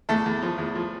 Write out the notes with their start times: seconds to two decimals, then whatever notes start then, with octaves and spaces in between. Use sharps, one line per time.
0.09 E2 A3 A4
0.26 E2
0.42 F3
0.58 E2
0.75 F3